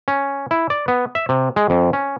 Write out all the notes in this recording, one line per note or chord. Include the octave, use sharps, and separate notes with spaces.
C#4
E4
D5
B3
E5
C3
G#3
F2
C#4